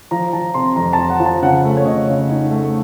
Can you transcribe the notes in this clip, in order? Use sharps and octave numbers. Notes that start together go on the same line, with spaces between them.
F3 A#5
F3 A5
C3 C6
F2 A#5
F2 A5
F#5
F3
A5
C#3 F#5
A3
C#5
C#3 D#5
C#3
D#4
A3